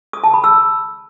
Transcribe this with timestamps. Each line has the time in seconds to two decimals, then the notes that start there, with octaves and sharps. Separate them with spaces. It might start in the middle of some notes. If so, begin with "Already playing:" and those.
0.13 D#6
0.24 A5
0.34 B5
0.44 E6